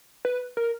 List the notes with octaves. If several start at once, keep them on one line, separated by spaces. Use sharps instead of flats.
B4
A#4